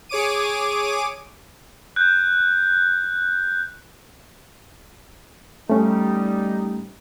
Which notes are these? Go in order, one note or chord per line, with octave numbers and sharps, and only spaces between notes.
G#4 C#5 D6 D#7
F#6 G6
G3 A3 C#4 D#4